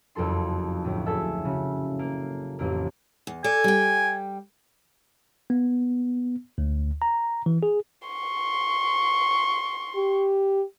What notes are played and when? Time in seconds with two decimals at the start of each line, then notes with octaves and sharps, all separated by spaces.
0.15 F#1 F2 F#3 A4 C6
0.84 D2 A2
1.06 G#4 A4 E5
1.45 C#3 F#3
1.99 A#3
2.59 A1 F2 A#3
3.27 E2
3.44 A4 D5 G#5
3.64 G3 G5
5.50 B3
6.58 D2
7.02 A#5
7.46 E3
7.63 G#4
8.08 C6 C#6
9.96 G4